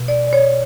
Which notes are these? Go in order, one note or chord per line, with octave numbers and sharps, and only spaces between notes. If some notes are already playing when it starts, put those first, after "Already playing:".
Already playing: B2
D5
D5
C#5